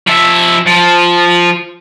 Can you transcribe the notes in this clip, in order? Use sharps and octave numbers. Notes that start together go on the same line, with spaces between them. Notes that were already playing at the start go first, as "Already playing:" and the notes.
F3 E5
F3